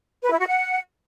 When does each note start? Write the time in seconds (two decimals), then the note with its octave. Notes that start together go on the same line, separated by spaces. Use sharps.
0.23 B4
0.31 E4
0.39 F#4
0.47 F#5